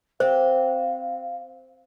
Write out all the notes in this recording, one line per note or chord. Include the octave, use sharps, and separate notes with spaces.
C4 G4 C5 F5